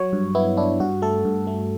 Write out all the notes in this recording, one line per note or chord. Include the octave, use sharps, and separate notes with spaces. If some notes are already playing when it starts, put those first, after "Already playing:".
Already playing: F#3 C#5
G2
B3 E4
D4 E4
G2 F#4
A3 A4
G2
A3